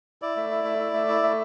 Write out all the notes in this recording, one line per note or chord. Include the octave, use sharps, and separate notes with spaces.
E4 D5
A3
E4
A3
E4
A3
E4
A3